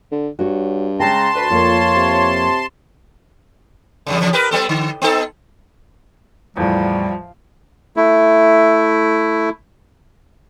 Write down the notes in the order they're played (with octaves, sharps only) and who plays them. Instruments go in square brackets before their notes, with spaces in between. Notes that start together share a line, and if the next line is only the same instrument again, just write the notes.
[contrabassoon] D3
[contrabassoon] G2 [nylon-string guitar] F#4 C#5
[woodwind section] C#3 G#3 A#5 [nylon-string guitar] G5 [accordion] A5 C6
[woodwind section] D2 F#4 B4
[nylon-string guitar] F2 A#3 [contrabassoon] A#2 [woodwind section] F4 C#5
[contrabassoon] C3
[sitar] E2 G2 C#3
E2 C#3 F3
G4 A#4 B4
G3 B3 A4
D3
B3 D#4 A4
[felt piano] E2 A2 [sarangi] F3 [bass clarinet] G3
[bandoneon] A3 E4